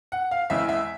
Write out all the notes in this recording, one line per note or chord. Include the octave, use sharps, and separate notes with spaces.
F#5
F5
E2 C#3 E3 G#3 C4 E5
E5